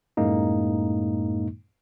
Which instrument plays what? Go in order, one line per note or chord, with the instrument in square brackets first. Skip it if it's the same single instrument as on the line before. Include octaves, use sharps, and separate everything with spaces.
[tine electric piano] F#2 A2 G#3 A#3 D#4